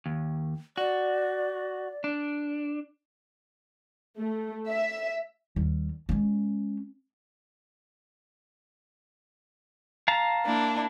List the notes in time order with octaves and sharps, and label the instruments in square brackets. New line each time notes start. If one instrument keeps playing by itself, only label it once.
[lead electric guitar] D#2
[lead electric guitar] F#4 [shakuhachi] D5
[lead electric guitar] D4
[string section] A3
E5
[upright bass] D#2 G3
G#3 C#4
[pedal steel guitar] F5 A5 A#5
[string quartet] A#3 D4 E4